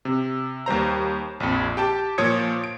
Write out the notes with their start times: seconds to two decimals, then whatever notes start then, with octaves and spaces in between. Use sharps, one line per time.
0.05 C3
0.66 D#2 G3 C5 A#5
1.40 A#1 F2
1.77 G4 G5 A5
2.18 A#2 F3 C#5 D#6 G#6 C#7
2.64 D7